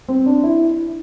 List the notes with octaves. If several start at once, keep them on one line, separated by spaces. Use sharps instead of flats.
C4
D4
E4